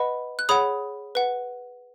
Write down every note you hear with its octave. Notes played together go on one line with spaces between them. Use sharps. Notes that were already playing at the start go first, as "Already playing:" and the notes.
Already playing: B4 D#5 F#5 B5
F#6
G#4 C#5 F#5 B5 D#6
B4 F#5